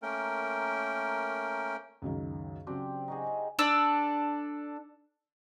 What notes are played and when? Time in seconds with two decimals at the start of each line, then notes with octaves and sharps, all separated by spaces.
0.03 A3 A#3 C#4 A#4 G5
2.02 C#2 F#2 D#3
2.67 C#3 F#3 C4 D4 G4
3.08 D#4 F#4 G#4
3.59 D4 A4 E6